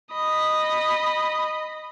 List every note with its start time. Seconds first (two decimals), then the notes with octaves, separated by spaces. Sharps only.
0.13 D#5 B5